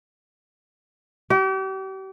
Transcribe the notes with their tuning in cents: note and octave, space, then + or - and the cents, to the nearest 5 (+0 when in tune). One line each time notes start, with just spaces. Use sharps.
G4 -40